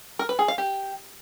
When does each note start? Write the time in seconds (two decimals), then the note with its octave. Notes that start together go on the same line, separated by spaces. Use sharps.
0.19 A#4
0.29 B4
0.39 G#4
0.48 F5
0.58 G4